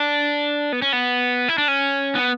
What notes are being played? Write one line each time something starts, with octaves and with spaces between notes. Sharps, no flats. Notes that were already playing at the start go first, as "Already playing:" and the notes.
Already playing: D4
B3
C#4
B3
E4
D4
C#4
B3